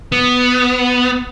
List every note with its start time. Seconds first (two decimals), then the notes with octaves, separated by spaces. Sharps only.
0.12 B3